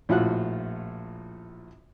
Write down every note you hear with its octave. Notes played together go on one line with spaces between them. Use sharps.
A#1 A2 F4 F#4 F#5 F#6